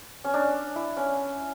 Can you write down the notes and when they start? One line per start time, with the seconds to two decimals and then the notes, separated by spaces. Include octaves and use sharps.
0.24 C#4
0.34 D4
0.76 E4
0.97 C#4